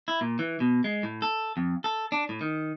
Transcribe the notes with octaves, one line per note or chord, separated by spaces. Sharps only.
E4
A#2
E3
B2
G#3
A2
A4
F2
A4
D4
A2
D#3